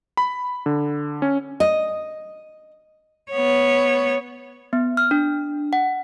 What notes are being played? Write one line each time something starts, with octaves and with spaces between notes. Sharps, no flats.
B5
D3
C#4
D#5
B3 C#5
B3
F6
D4
F#5